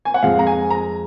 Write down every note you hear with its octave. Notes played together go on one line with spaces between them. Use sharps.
G#5
F#5
F2 F3 G#3 F5
A#5
G#5
A#5